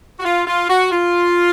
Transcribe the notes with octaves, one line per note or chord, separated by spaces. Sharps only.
F#4
F4
F4
F#4
F4